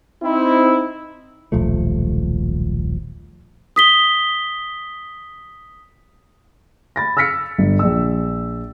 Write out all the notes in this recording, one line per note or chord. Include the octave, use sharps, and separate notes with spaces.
C4 D#4 E4
D#1 B1 F3 A3
D#6 B6 G7
B5 A6 A#6
E6 F6 A#6 B6 C#7
G1
A#1 E6